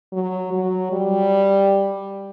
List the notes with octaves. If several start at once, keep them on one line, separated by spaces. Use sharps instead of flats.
F#3
F#3
G3